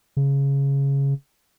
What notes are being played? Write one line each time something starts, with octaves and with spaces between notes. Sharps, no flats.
C#3